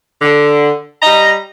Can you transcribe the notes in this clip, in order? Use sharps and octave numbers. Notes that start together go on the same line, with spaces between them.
D3
G3 D#5 A#5